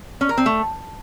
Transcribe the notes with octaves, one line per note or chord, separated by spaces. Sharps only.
C#4
A#4
C4
A3